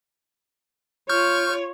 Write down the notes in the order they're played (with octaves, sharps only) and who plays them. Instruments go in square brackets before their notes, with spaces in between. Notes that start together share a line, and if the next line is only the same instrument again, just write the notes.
[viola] F4 C#5 [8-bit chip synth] C#6 F6 G6